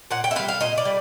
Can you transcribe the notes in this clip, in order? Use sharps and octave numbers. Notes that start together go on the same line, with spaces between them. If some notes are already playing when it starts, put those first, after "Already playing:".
A#2 F#5
G5
E5
G3 B3 F5
F5
A#2 D#5
D5
G3